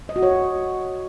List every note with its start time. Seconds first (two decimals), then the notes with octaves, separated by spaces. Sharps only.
0.09 D#5
0.16 F#4
0.23 C#5